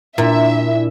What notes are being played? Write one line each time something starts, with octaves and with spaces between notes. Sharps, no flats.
A#2 D4 E4 E5